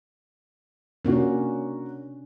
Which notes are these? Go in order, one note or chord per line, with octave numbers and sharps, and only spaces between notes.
C3 A#3 C#4 D4 F#4